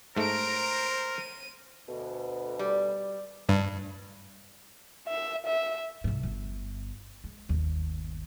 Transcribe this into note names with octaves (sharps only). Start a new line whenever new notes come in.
G#2 A3 A#4 C5 A#5 D7
D#7
D2 B2
G3
G2
E5
E5
C2 G#2
G1
G#3
G1 D#2